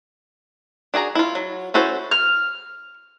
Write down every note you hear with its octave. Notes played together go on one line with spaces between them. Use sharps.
D4 F#4 G#4 A#5
E4 F4
F#3
C#4 E4 F#4 A4 C5
F6